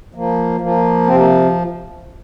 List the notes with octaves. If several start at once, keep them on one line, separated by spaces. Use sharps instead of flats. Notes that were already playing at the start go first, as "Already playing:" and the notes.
F3 A#3
F3 A#3
C3 C4
A#3